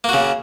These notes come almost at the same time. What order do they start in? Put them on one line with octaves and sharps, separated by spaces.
A#3 F#4 C#3